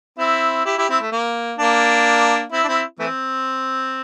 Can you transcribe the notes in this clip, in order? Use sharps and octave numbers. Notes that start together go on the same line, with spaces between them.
C4 E4
E4 G4
E4 G4
C4 E4
A3
A#3
A#3 D4
C4 E4
D4
C4 E4
E3 A3 C4